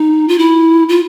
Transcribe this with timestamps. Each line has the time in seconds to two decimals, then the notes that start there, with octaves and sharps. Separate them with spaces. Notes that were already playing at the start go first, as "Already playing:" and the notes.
Already playing: D#4
0.28 F4
0.39 E4
0.89 F4